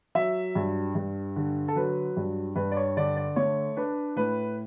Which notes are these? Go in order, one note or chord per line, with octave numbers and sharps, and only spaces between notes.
F#3 E5
G2
G2
D3
A4
F#3 B4
G2
G2 B4
D5
C#5
D3 D5
D5
A3 C#5
D4 B4
A2 B4